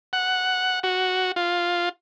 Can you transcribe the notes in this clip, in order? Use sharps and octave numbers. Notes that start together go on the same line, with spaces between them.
F#5
F#4
F4